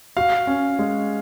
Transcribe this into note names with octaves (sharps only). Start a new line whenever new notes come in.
F#4 F5
C#4
G#3